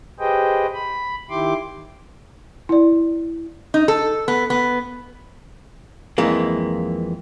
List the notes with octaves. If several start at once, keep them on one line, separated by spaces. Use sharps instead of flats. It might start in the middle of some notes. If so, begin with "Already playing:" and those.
G4 G#4 B4 C5 D#5 G5
B5
D#3 E4 G4 C6 D6
E4 D5
D#4
A4
B3
B3
F2 E3 G#3 A#3